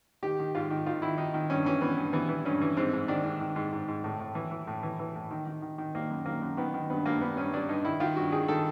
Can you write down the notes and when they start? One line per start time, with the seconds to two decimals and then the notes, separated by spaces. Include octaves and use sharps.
0.23 D#3 G4
0.40 D#3
0.55 G#2 F4
0.71 D#3
0.86 D#3 F4
1.02 D#3 E4
1.18 D#3 D#4
1.34 D#3
1.50 G2 C#4
1.65 E3 C#4
1.81 E3 B3
1.97 G2
2.13 E3 B3
2.29 E3
2.45 G2 C#4
2.61 E3
2.77 G#2 C4
2.93 G#2
3.08 D#3 D4
3.25 G#2
3.41 D#3
3.56 G#2
3.73 G#2
3.88 G#2
4.04 A2
4.20 A2
4.35 E3
4.51 E3
4.67 A2
4.83 E3
4.99 E3
5.15 A2
5.31 D#3
5.46 D#3
5.62 D#3
5.78 D#3
5.95 D#3 A#3
6.10 F#2
6.26 D#3 A#3
6.42 F#2
6.57 D#3 B3
6.74 D#3
6.90 G2 B3
7.05 G2 A#3
7.21 G2 B3
7.37 G2 C#4
7.53 G2 D4
7.69 G2 D#4
7.85 D#3 E4
8.00 D#3 F4
8.16 G2 F#4
8.32 D#3 G#4
8.48 D#3 A4